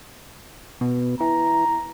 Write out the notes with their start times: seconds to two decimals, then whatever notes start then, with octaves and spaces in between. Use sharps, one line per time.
0.81 B2
1.20 E3 A#5